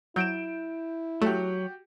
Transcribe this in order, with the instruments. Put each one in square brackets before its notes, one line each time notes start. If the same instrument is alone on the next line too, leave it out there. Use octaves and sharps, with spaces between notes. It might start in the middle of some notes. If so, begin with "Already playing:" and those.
[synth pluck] F#3 [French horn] E4 [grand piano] G6 D7 E7
[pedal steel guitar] F#3 [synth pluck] A3 [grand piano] F#4 G4